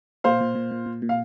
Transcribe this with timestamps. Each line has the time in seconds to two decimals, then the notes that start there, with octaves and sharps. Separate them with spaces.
0.24 A#2 C5 F5
0.41 A#2
0.55 A#2
0.71 A#2
0.86 A#2
1.02 A#2
1.09 F5